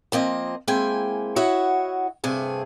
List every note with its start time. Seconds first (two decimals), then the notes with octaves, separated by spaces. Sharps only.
0.12 F3 A#3 C4 D#5
0.68 G#3 A#3 C4 E4 G5 G#5
1.36 E4 F#4 C#5 D#5 E5 F#5
2.24 G2 C3 A3 G#4